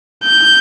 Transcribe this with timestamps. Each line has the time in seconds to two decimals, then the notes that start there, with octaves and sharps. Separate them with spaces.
0.24 G6